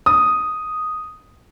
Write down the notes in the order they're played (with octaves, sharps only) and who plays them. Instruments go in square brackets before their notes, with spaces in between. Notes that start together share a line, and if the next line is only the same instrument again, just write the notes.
[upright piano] D#6